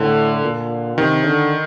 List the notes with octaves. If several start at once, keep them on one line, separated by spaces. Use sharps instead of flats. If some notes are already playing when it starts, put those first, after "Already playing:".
Already playing: A2 D3
A#2
C3 D#3
D3